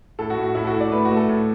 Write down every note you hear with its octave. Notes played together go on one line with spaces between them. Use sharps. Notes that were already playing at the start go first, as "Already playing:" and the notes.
A2 A4
F#4
A2
F#4
A2 E4
A4
F#4
A2
D5
A3 B4
F#4
A3
A4
A2